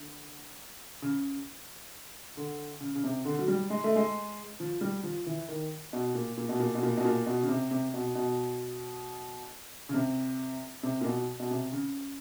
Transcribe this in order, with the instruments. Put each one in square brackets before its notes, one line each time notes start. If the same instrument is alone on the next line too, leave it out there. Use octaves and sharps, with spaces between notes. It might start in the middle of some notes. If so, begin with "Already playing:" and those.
Already playing: [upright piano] D3
C#3
D3
C#3
C#3
C3
D3
F#3
G3
G#3
A3
G#3
F3
G3
F3
E3
D#3
B2
A#2
A#2
B2
A#2
B2
A#2
B2
A#2
B2
C#3
C3
C3
B2
B2
C#3
C3
C3
A#2
B2
B2
C3
C#3